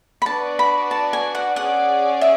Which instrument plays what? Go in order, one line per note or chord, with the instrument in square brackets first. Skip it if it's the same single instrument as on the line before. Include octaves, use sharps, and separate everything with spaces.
[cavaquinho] B5
[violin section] B3 D4 F#4 B4 D5 [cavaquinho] A5
[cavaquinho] B5
A5
G#5
F#5
[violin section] C#4 G#4 D5 [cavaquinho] F#5
[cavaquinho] E5